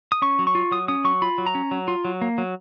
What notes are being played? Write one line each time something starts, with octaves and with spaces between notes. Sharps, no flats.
D#6
C#4 C#6
F#3
C#6
F4
F#3 D#6
C#4 D#6
F#3 C#6
F4 B5
F#3
A#5
C#4
F#3
F4
F#3
A#3
F#3